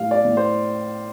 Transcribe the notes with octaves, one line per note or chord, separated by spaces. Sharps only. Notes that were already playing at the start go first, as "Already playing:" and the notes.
Already playing: A2 G3 F5
D5
A2
C5